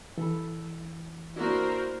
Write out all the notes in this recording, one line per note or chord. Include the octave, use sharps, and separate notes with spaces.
E3 A4 B5
A#3 D4 E4 F#4 A#4 C5